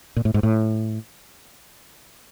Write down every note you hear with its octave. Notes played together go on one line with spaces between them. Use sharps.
A#2
A2
G#2
A2